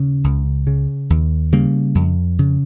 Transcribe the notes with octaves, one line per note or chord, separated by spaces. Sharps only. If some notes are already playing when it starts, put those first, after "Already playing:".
Already playing: D#2 C#3
C#2
C#3
D#2
C#3 G3 A#3
F2
C#3